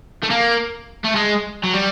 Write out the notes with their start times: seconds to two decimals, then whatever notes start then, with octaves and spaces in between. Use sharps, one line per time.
0.23 A3
0.30 A#3
1.05 A3
1.16 G#3
1.64 F#3
1.74 G3